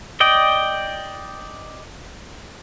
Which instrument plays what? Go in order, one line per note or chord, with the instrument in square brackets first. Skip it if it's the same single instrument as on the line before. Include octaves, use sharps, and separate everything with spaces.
[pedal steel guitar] D5 D#5 G5